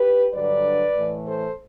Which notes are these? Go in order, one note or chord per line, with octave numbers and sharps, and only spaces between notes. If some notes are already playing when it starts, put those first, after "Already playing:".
Already playing: G4 B4
G2 D3 F#3 B4 D5
A2 E3 A3
A4 C5